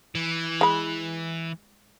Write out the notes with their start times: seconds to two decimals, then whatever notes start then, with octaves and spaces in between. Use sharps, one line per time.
0.15 E3
0.61 G#3 B5